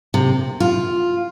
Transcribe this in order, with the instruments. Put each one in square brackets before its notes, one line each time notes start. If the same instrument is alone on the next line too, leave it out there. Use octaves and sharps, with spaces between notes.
[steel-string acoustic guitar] C3
F4